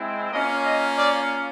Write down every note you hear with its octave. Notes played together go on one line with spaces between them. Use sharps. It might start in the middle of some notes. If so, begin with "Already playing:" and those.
Already playing: G#3 C4 E4
A#3 C#4 F4 D#5
D#5
D5